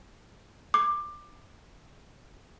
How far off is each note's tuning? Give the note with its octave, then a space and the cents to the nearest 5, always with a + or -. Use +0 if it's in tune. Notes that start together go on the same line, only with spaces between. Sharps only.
D6 +15